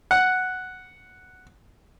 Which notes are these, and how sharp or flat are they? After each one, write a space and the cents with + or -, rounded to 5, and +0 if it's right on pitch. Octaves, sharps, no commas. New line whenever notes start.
F#5 +0